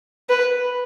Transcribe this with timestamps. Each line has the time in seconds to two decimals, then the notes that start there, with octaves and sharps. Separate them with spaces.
0.30 B4